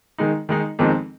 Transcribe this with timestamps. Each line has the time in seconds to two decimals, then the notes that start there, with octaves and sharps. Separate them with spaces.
0.18 D#3 G#3 D#4
0.49 D#3 G#3 D#4
0.79 F2 D#3 G#3 C4 D#4